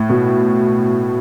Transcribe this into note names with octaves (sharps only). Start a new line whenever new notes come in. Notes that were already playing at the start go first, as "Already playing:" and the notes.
Already playing: A2
B2